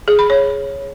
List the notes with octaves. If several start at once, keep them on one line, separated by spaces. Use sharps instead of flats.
G#4
B5
C#5